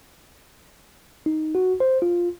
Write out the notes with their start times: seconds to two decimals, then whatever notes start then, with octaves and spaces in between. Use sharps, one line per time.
1.26 D#4
1.55 F#4
1.80 C5
2.02 F4